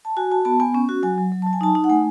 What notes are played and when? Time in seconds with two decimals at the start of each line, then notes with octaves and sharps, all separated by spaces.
0.05 A5
0.17 F#4 G#5
0.31 F#4 A5
0.45 B3 A5
0.60 B3 G#5
0.74 C#4
0.89 F#4
1.03 F#3 G#5
1.18 F#3
1.32 F#3
1.42 F#3 A5
1.53 G#5
1.61 D#4 A5
1.75 D#4
1.84 F#5
1.89 A3 G#5